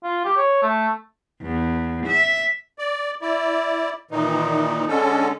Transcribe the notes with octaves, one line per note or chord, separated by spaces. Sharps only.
F4
G4
C#5
A3
E2
E5
D5
E4 D5
A#2 D#3 E3 D#4
D3 G#3 C#4 A4